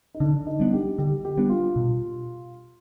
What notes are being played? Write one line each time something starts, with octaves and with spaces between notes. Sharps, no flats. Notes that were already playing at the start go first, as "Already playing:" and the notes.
D#4
D3 D4
D#4
G3 B3 D4
G4
D3 G4
G4
G3 B3 D4
F4
B2